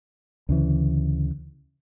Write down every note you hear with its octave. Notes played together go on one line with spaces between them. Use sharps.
D2 C#3 E3